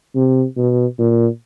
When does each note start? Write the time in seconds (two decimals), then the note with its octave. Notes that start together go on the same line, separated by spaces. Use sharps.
0.15 C3
0.57 B2
0.98 A#2